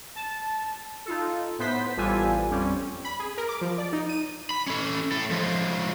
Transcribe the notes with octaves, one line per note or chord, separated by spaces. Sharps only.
A5
D#4 F4 A4
A2 B3 C5 B6
A1 G3 B3 F4 A4 G#5
F2 G3 C4 C#4
B5
G#4
A#4
D6
F3
D5
D#4
D#7
B5
C#4 A4
A2 A4
F3 G#3